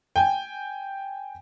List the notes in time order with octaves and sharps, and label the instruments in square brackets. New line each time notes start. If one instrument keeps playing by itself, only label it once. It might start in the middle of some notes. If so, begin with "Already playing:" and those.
[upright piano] G5 G#5